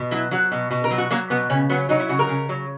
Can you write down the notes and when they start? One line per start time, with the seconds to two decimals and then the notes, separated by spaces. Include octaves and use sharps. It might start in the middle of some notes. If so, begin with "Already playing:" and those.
Already playing: B2
0.11 F#3 E4
0.31 F#3 F#4
0.52 B2
0.71 B2
0.84 A#4
0.91 F#3
0.98 F#4
1.11 F#3 A#3
1.30 B2 B3
1.50 C#3 C#4
1.70 F#3 B3
1.89 F#3 D#4
2.00 E4
2.09 C#3 F#4
2.19 A#4
2.29 C#3
2.49 F#3